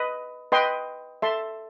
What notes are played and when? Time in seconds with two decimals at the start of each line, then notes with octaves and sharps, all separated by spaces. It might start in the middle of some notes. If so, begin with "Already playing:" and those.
Already playing: B4 D#5
0.52 B4 D#5 G5 C6
1.22 A4 E5 A5 C6